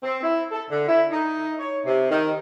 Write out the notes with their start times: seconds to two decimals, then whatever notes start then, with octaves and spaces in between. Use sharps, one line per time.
0.03 C4
0.23 E4
0.52 A4
0.70 D3
0.88 E4
1.11 D#4
1.60 C#5
1.86 C3
2.11 D#3